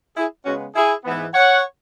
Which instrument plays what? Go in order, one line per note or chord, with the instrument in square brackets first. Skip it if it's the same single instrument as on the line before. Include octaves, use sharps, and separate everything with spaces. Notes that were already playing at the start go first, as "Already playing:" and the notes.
[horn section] E4 G#4
C#3 G#3 B3 C#4 F#4
E4 G#4
G#2 E3 B3
C#5 F#5